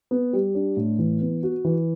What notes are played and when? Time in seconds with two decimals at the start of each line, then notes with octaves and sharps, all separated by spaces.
0.11 B3
0.33 G3
0.55 D4
0.77 A2
0.99 E3
1.21 B3
1.43 F#4
1.65 E3